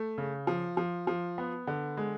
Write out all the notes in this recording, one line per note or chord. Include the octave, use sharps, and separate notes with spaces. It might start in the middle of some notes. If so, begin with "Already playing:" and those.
Already playing: A3
C#3
F3
F3
F3
B3
D3
G#3